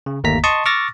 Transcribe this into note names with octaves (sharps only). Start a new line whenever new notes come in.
C#3
G1 D#2 A3 A#3 A#5 B6
D#5 A5 C6 C#6 D#6
C#6 D6 E6 F6 A6 A#6